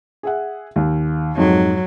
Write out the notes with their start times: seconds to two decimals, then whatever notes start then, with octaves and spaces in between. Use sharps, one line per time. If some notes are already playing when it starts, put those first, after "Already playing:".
0.23 G#4 E5 F#5
0.76 D#2
1.37 F2 G#2 F#3 D#4